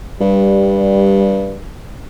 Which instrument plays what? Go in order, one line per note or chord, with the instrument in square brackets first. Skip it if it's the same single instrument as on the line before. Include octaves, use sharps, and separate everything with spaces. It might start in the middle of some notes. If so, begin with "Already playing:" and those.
[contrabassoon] G2 [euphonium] G3